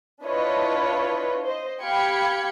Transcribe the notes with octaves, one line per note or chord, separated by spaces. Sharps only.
D4 E4 F4 B4 C#5 D#5
C5 D#5
G4 F5 G5 B5 G#6 C#7